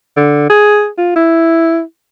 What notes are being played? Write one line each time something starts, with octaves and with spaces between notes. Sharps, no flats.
D3
G#4
F4
E4